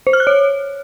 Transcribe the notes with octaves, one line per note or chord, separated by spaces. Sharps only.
C5
F6
F#6
C#5